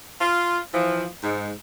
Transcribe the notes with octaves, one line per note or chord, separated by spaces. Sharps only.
F4
E3 F3
G#2